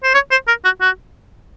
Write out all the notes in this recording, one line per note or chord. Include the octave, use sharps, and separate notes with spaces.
C5
C#5
C5
A#4
F#4
F#4